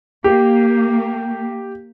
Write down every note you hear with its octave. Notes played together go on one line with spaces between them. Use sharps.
A#3 G4